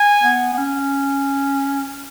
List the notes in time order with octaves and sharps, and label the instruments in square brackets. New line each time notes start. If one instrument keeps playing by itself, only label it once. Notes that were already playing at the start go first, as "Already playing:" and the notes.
Already playing: [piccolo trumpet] G#5
[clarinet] B3
B3
C#4